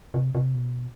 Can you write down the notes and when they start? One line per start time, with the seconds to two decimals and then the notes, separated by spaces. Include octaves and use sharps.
0.14 C3
0.35 C3
0.55 B2